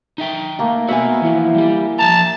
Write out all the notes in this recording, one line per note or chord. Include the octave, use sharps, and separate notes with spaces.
D#4 E5 G5
A3 A#3
B3 F#4 E5 F#5 G#5
E3 F3 E4
G3 G4
F3 A#4 A5 A#5